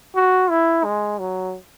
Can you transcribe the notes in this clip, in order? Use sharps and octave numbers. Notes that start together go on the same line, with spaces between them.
F#4
E4
G#3
F#3